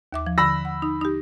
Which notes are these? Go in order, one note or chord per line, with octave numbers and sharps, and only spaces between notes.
D#2 E5 D6
F3
D3 B5 E6 A#6
F#5
D#4
D#4 G4